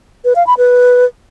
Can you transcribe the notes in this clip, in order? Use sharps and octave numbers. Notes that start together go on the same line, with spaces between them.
B4
F5
B5
B4